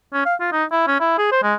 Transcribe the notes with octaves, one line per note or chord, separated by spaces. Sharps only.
C#4
F5
F4
D#4
E4
C#4
E4
G#4
C5
G#3